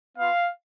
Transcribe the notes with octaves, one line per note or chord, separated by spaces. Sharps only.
B3 F4 F5